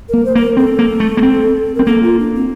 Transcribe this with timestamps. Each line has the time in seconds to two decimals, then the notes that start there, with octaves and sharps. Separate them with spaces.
0.09 A#3 A#4
0.25 C5
0.35 A#3 C5
0.40 A#4
0.57 C4 A4
0.79 A#3
1.00 A3
1.17 A#3
1.22 C4
1.75 C4 A#4
1.86 A#3 A4
2.03 F4
2.19 D4
2.35 C4